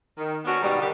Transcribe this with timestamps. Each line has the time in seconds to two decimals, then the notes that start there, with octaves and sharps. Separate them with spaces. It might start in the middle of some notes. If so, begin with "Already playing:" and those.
0.17 D#3
0.45 B3 C#4 D4 F#4
0.61 G#2 B2 D#3 G3
0.79 D3 D#3 G3 G4